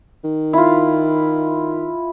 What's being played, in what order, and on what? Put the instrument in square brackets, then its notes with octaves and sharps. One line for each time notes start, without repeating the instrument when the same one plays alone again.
[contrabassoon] D#3
[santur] E4 F4